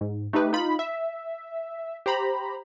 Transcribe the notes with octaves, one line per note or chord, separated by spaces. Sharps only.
G#2
A3 D#4 G4 B4
D#4 F4 B5
E5
G4 C5 A#5 B5